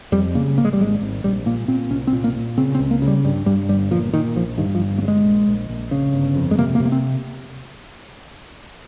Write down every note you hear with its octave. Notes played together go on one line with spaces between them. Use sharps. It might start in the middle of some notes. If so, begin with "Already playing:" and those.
F2 G3
C#3 A#3
G#1 A#3
G#3
G3
G#1 G#3
G#1
A#1 G3
A#2 A#3
A#2 C4
C2 C#4
C4
A#2
A#3
A#2
C#3 C4
C4
C#2
A#3
C#3
G3
G2 G3
G2 G3
G1 G3
A#2 F3
A#2 D#3
A#1 F3
G2 D#3
F3
G1
A#3
G2
G#3
A#1
A#1
A#1
C#3
G1
F2
G#3
C3 A#3
A#3
C3
A#3
C4